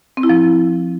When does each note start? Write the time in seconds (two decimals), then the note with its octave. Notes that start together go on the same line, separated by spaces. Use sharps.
0.17 C4
0.23 E4
0.29 F3